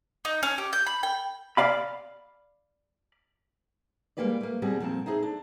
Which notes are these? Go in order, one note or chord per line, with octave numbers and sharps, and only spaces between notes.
D#4
C#4
G4
G6
B5
G5
D5 F5 B5
G3 G#3 A#3 F#4 B4 D5
A3 A#3
B2 G3 C4 F#4 G#4
F2 A#2 C4 A5
D#4 E4 G#4 A4 C5
D4